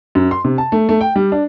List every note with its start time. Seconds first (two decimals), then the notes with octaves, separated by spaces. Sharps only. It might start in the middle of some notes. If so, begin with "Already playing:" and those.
0.15 F#2
0.31 C6
0.45 C3
0.58 A5
0.72 A3
0.89 A3
1.01 G5
1.16 G3
1.32 D4